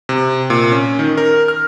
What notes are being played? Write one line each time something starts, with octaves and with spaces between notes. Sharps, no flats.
C3
A#2
C#4
D#3
A#4
F6